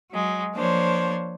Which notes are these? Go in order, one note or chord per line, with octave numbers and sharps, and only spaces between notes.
F#3 G#3
F3 A#3 D4 C5 C#5